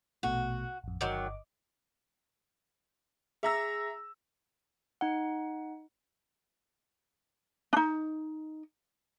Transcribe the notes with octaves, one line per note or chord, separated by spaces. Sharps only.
A#1 B2 A3 F#4
A1 F2
G1 D#3 F#3 D#5 D6
G#4 E5 A#5 E6 A#6
D#4 F#5
D4 D#4